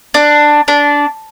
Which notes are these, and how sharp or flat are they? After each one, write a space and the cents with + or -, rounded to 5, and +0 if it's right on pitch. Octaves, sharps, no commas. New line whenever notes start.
D4 +10
D4 -15